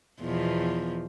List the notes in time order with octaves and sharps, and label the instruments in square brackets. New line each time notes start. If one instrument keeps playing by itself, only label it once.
[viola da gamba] E2 B2 F3